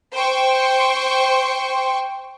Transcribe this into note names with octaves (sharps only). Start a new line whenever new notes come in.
C5 G5 C6 C#6